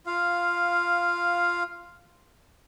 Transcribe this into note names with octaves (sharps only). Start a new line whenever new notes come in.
F4 F5